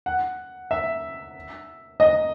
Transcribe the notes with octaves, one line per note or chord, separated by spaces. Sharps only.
F#5
E5
D#5